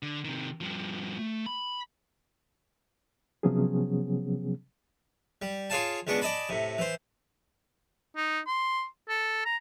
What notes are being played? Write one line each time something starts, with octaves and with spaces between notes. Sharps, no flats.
D3
C3 D#3
G2 F3
A3
B5
C3 F3 F#3 B3 C#4 G#4
G3
F4 G#4 C#5 F5 G#5 A5
C#2 G#3 B3 D4 C#6
D5 D#5 G#5 A5 B5
A2 C3
E3 C5
D#4
C6
A4
A#5